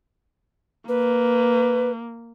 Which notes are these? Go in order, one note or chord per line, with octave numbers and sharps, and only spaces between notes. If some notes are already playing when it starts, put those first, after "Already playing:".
A#3 B4